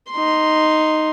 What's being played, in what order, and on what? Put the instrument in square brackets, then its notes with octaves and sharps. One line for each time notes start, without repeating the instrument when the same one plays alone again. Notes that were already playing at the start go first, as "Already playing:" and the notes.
[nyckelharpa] D#4 C6